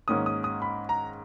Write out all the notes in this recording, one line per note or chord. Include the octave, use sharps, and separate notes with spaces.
G#2 D#3 A#3 C#4 D#6
D#6
D#6
B5
A#5